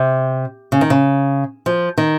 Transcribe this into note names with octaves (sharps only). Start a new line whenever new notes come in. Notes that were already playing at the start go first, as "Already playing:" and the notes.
Already playing: C3
C#3
D#3
C#3
F3
D#3